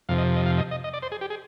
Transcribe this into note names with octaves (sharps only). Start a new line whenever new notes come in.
F2 C3 F3 F5
D#5
D#5
F5
D#5
D#5
D#5
D5
C5
G#4
G4
G#4